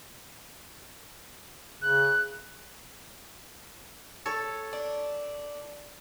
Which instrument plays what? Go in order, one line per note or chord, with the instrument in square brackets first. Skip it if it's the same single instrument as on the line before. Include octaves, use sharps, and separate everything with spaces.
[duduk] C#3 [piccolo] F#6
[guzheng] A4 C#5
[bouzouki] D4